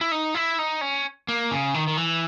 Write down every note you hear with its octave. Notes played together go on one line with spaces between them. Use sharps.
E4
D#4
E4
D#4
C#4
A#3
C#3
D#3
D#3
E3